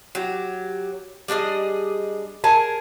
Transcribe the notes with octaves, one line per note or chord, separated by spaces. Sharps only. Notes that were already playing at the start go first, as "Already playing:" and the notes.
F#3 G4
G3 D4 G#4 D#5
G#4 A#4 G#5 A5